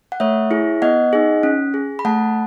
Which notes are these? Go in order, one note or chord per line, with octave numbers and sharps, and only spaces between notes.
F#5
A3 C#5 E5
E4 G#4
B3 D#5 F#5
D#4 G#4
C#4
G#4
B5
A3 F#5 A5